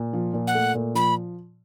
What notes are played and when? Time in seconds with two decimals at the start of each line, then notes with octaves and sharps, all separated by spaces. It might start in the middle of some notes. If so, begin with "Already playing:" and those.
Already playing: A#2
0.13 F3
0.33 A#2
0.47 F#5
0.55 A3
0.74 A#2
0.95 F3 B5